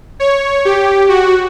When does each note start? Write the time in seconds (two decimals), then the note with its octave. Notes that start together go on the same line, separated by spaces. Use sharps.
0.20 C#5
0.65 G4
1.09 F#4